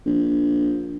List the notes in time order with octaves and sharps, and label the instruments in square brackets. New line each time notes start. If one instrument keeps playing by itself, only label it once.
[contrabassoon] A#1